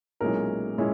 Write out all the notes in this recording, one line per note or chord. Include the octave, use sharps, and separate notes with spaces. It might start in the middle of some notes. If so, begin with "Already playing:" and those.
B1 A#2 G#3 C#4 E4 A#4
A#2 G#3 C#4 E4